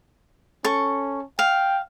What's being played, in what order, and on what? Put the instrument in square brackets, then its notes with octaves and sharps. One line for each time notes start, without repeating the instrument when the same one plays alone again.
[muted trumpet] C#4 [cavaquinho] A4 C#6
[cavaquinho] F5 [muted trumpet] G5